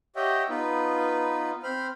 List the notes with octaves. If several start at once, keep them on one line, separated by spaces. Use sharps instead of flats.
G4 C#5 D#5 E5 F#5 G5
B3 D#4 F4 B4
C4 C5 B5 F6